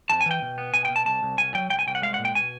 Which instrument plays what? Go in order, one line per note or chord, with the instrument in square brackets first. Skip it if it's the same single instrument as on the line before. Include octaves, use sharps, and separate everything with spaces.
[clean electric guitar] F2 A5
G#5
E3 G5
B2
B3
B2 G#5
G5
B2
A5
C2 A5
C2
C2 G#5
F#3 G5
C2 G5
G#5
C2 G5
F#5
G#3 F5
F#5
A#2
G5
B2 G#5